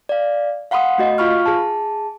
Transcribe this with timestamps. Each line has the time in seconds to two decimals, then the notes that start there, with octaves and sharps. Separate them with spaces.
0.09 D5 F5
0.71 F5 F#5 B5 C6 D#6
0.98 A3 F#4 D#5
1.18 F4 F5 B5 C#6 F6
1.46 G#4 A5